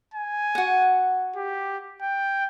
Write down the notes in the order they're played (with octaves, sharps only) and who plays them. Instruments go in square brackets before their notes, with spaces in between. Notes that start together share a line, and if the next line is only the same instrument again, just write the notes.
[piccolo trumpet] G#5
[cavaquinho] F#4 F#5
[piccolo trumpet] G4
G5